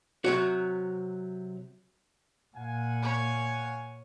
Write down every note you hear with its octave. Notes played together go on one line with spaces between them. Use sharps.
C3 F#3 F#4
A#2 F5 F#5 G#5
C#5